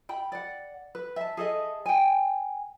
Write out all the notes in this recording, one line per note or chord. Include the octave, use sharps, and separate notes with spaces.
G5 B5
D5 F#5
B4
E5 A5
G#4 A4 D#5 E5
G5 G#5